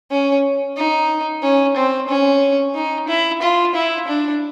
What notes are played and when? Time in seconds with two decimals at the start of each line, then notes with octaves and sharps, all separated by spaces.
0.11 C#4
0.77 D#4
1.43 C#4
1.76 C4
2.08 C#4
2.75 D#4
3.08 E4
3.42 F4
3.75 E4
4.08 D4